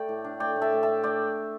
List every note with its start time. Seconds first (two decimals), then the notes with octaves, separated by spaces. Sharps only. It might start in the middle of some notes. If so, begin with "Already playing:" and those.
Already playing: A3 D5 G5
0.09 A2
0.24 D4
0.40 A3 D5 G5
0.56 A2
0.61 E5 A5
0.73 A2
0.83 E5 A5
0.88 D4
1.03 A3 D5 G5